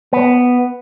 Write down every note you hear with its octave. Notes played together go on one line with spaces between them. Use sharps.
B3